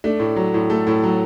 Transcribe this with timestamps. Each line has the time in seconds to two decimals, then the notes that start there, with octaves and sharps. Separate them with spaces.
0.04 A3 D4
0.19 A2
0.36 F#3
0.54 A2
0.70 A3 A4
0.87 A2
1.03 F#3